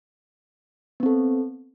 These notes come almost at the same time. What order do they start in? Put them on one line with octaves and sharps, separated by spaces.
B3 C4 A4